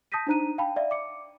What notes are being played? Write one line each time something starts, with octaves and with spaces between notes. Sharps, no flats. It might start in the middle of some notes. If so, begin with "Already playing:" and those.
A5 D#6 G6 A#6 B6 D#7
D4 D#4 C5 A#5 F#6 D#7
F5 G5 A5 B5
D5 E5 F5
D6 C#7